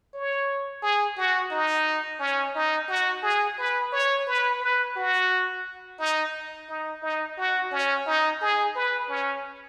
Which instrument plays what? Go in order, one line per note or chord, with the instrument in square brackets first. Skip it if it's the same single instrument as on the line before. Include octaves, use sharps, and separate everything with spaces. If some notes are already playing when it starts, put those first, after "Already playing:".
[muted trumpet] C#5
G#4
F#4
D#4
C#4
D#4
F#4
G#4
B4
C#5
B4
B4
F#4
D#4
D#4
D#4
F#4
C#4
D#4
G#4
B4
C#4